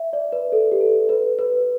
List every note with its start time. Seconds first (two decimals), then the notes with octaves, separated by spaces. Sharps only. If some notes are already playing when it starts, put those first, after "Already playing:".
Already playing: E5
0.13 D5
0.32 B4
0.52 A4
0.72 G4
0.81 A4
1.09 B4
1.39 B4